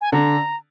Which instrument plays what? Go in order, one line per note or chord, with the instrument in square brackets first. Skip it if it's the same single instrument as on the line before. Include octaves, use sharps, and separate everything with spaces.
[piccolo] G#5
[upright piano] D3 [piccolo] A#5